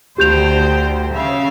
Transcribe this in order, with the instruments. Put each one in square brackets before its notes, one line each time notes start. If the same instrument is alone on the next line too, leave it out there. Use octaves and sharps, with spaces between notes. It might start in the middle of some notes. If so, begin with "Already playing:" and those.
[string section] D2 [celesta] G4 G6 F7 [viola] C5 G5
[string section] C#3 [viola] E5 F5